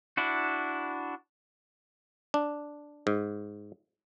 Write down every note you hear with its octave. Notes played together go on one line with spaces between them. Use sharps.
D4 E4 F#4
D4
G#2